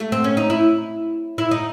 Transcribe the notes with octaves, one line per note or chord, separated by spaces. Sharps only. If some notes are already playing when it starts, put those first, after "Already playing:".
A3
C4
C#4
D#4
E4
E4
D#4